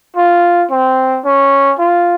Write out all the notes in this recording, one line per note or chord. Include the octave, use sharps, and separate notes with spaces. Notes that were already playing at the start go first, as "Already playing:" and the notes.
F4
C4
C#4
F4